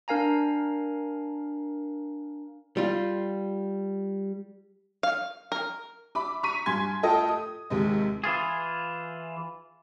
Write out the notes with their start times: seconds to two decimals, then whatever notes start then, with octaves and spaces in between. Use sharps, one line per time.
0.08 D4 A#4 F5 G#5 A#5
2.77 G3 F4
5.03 F5
5.52 A#4
6.15 E5 B5 D6
6.43 A#5 C#6 B6 D#7
6.66 G2 G#5 C6 G#6
7.03 A3 F4 A4 D#5 G5
7.28 D#6
7.70 D#2 C3 G#3
8.24 E3 F4 G#4